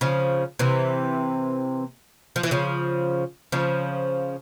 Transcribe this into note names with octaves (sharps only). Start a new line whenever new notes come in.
C#3 F3
C3 E3
F3
E3
C#3 F3
C#3 F3